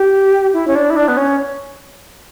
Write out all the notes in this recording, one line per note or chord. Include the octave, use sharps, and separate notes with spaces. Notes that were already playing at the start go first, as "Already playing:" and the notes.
Already playing: G4
E4
C#4
D4
E4
D4
B3
C#4